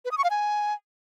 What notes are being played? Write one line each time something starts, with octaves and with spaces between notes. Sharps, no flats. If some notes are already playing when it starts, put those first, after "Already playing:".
B4
D#6
C#6
F5
G#5